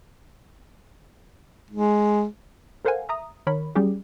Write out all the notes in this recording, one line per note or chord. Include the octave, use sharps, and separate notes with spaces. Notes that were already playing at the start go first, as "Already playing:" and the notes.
G#3
A4 A#4 C5 F5 F#5 G#5
E5 A#5 D#6
D#3 A#4 C#5 B5
F#3 G3 C#4 G4 G#4